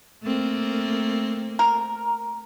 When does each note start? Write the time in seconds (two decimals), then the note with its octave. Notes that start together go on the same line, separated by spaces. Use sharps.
0.22 A3 A#3 C4
1.59 A#4